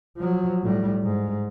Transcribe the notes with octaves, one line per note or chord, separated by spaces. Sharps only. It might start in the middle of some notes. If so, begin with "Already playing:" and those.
F3 F#3
A2 G3
G#2